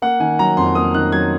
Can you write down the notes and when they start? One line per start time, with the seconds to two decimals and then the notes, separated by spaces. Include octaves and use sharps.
0.02 A#3 F#5
0.20 D#3 G#5
0.39 F#3 A#5
0.57 F2 C6
0.75 A#3 D#6
0.94 D#3 F#6
1.12 F#3 G#6